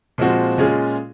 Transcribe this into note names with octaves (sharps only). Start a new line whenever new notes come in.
A#2 F3 G#3 C4 F#4
A#2 G#3 C#4 F4 G#4